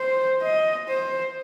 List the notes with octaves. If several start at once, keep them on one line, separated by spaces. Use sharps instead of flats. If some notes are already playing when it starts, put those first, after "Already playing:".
Already playing: C5
D#5
C5